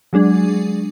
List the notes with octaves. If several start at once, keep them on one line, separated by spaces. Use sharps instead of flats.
F#3 G#3 D4 G#4